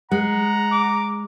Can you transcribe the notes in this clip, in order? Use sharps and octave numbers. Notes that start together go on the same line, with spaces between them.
G#3 F#5 A#5
D6